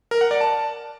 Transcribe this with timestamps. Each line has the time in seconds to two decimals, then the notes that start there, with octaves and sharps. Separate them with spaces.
0.11 A#4
0.21 F#5
0.31 D5
0.41 A5